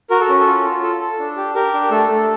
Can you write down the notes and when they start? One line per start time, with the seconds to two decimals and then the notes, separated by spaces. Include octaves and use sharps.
0.10 F#4 A#4
0.21 A4
0.29 C#4
0.40 A4
0.47 F4
0.65 F4
0.83 A4
1.01 A4
1.19 D4
1.37 G4
1.55 G4 A#4
1.73 D4
1.91 A3 A4
2.09 A3